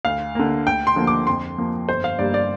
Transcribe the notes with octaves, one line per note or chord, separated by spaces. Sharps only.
D2 F5
D3 A#3
D2 G5
C6
D3 F3 A#3
D6
F2 C6
F3 A#3
G1 C5
F5
G2 G3 A#3 D5
D5